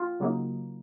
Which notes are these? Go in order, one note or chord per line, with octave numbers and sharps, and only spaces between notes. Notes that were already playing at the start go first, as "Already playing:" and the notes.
Already playing: F4
C#3 F#3 A#3 D#4